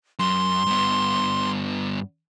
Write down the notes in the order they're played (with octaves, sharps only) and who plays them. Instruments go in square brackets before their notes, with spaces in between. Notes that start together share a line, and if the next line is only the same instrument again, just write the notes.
[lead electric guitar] F#2 [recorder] C6
[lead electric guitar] G2 B3